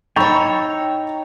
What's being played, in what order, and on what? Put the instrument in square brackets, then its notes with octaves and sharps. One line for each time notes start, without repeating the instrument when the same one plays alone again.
[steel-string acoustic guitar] D#4 C#5 [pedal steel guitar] G5 A#5 E6 [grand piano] B5 C#6 A6